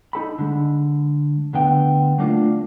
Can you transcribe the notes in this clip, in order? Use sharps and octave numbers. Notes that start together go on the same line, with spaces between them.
D#4 A4 B5
D3 G#3
D2 D3 B3 G5
F#3 A3 A#3 D4 F4